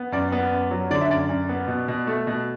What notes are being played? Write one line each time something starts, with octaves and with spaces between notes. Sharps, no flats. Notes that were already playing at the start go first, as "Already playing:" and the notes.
Already playing: B3
F#2 D5
B3
F#2
F#3
D3 D5
E5
F#2 D5
F#2
B3
B2
B2
A3
B2